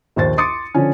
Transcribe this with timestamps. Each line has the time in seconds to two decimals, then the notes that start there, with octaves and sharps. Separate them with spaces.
0.16 A#1 D#2 C5 A6
0.38 C6 D6 D#6 A6 C#7
0.75 D3 F3 C#4